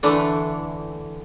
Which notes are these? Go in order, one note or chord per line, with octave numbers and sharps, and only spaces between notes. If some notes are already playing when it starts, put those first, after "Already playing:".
D3 E3 A3 D4